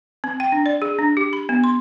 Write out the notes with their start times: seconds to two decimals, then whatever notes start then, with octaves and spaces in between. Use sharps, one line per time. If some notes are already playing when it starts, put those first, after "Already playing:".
0.24 C4
0.40 G5
0.52 D4
0.66 D5
0.82 G#4
0.99 D4
1.17 G4
1.33 B5
1.49 B3
1.64 C6